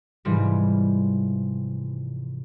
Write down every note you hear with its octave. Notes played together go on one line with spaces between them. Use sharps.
G#2 C3 E3 F3 G3